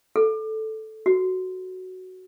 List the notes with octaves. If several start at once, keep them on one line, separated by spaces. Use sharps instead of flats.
A4
F#4